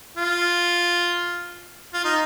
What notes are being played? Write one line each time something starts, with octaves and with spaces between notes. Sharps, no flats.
F4
F4
D#4